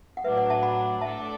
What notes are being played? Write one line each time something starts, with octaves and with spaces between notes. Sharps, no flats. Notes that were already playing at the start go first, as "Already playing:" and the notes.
F#5
A2 F#3 D4 B4 E5
D5 F#5
E5 A5
F#5 B5
A2 A3 D4 A4 D5 E5 A5